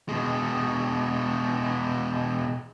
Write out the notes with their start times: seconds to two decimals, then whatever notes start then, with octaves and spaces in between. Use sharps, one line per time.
0.08 B2 G#3